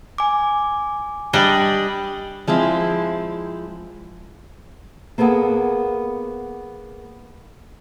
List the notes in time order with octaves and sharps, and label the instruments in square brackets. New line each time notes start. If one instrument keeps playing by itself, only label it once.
[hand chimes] G#5 D6
[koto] G3 D4 D#5
[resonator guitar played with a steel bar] F3 G#3 C4 E4
[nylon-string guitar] A#3 B3 G#4 A4 F#5